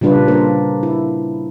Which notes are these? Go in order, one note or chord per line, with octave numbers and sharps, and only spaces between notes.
A#2 C#3 G3 D4 F4 B4
A#3 D4 A#4 C5
E4